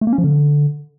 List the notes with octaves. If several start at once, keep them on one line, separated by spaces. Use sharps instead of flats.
A3
A#3
C#4
F3
D3